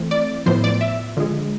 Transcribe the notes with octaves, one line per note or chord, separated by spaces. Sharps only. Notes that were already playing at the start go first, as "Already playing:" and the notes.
Already playing: E3 A3 C4
D5
A2 F3 B3 C5
D5
E5
D3 F3 G#3